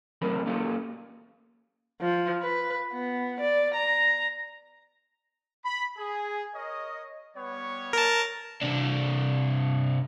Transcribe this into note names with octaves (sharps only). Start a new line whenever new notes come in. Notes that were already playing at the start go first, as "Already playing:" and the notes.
F#3 A3 C4 A#4 C5 B5
A#3 C#4 F4 G4 A4
F3
B4
B3
D5
A#5
B5
G#4
A#4 C#5 D#5
G3 B3 C#5
A#4 A5
C3 D4